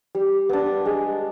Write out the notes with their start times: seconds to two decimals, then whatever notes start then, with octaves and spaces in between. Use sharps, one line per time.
0.15 G3
0.49 B3 D4
0.85 G#3